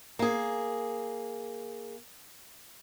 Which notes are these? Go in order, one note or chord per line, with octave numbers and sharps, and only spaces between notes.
A#3 G#4